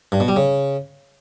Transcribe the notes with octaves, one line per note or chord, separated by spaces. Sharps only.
G2
B2
G3
C#3